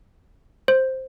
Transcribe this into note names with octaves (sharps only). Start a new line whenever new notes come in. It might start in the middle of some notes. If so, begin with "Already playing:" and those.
C5